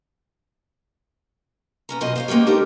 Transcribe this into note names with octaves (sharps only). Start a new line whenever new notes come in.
B3 C#4 A#5
F#2 B2 F3 C5 D#5 G#5
C5 C#5 F5
G#3 A#3 B3 C#4 G4
D4 D#4 G4 A4 A#4 C#5